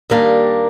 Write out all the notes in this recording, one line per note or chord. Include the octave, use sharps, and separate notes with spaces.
D#2 D#3 G3 A#3 D4